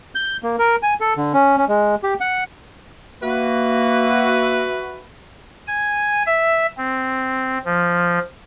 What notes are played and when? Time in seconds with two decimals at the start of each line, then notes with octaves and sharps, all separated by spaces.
0.15 G6
0.43 A#3
0.59 A#4
0.83 G#5
1.01 A4
1.17 D3
1.34 C#4
1.57 C#4
1.69 G#3
2.03 G4
2.20 F#5
3.22 A#3 F#4 B4 E5
5.68 G#5
6.26 E5
6.77 C4
7.65 F3